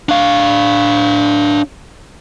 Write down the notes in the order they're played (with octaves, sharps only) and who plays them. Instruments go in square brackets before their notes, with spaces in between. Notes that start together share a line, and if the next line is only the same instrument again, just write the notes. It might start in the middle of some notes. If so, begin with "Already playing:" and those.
[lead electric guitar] D4 F5